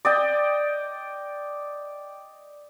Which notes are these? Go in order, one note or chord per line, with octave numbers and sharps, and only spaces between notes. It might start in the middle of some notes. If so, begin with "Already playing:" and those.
D5 D#5 G5